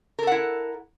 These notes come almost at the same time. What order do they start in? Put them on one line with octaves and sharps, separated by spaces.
A#4 A4 F#5 E4